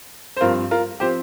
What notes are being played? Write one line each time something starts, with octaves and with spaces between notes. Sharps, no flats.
C5
G2 F3 C4 F4 A#4
F4 A#4
F3 C4 G4 C5